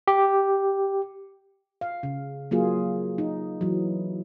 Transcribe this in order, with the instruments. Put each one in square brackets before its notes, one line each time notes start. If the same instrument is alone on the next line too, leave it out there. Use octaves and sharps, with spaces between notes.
[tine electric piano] G4
[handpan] F5
C#3
F#3 A#3 F4 G#4
D#4
E3 F#3